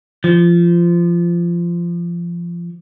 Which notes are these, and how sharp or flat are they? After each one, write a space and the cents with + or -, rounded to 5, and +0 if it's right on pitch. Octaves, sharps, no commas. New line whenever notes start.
F3 -20